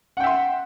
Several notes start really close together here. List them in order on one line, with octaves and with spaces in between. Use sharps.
F#5 G5 E5 C6